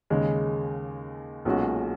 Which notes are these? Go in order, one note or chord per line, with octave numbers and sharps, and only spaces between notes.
D#2 C#3 G#3
B1 A#2 G#3 C#4 F#4